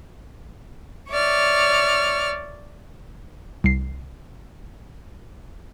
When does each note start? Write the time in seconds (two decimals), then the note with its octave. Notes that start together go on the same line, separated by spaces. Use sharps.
1.10 C#5 D5 E5 F6
3.64 C2 C7